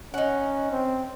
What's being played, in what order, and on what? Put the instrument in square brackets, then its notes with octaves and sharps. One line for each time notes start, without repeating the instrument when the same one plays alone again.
[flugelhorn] C#4 [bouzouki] D#4 F#5
[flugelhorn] C4